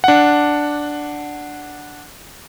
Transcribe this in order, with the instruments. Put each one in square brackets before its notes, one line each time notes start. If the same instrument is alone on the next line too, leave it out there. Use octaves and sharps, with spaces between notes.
[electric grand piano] D4 F#5